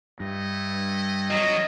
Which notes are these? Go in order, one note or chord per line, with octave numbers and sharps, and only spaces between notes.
G2 A3 E4 D#5
F#3 E4 F4 D#5